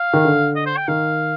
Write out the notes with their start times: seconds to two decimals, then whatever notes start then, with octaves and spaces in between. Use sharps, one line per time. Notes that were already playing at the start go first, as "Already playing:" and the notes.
Already playing: F5
0.13 D#3
0.25 D3
0.56 D#5
0.66 C5
0.77 G5
0.88 D#3 F5